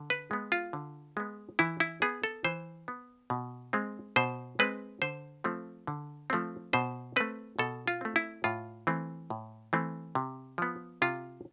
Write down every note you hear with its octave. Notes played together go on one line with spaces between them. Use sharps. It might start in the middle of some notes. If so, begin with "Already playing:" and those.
Already playing: D3
B4
G#3 B3
F4
D3
G#3 B3
E3 E4
E4
B3 G#4
A4
E3 C5
B3
B2
G#3 C4
B2 C5
G#3 C4 B4
D3 C5
F3 A3 C4
D3
F3 A3 C4
B2 C5
A3 C4 B4
B2 A4
F4
A3 C4
E4
A2 F4
E3 A3 C4
A2
E3 A3 C4
C3
F3 B3
C3 F4